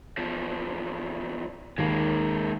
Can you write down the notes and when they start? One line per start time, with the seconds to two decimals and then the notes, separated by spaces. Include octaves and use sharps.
0.18 E2 F3
1.78 D#2 G#3 A#3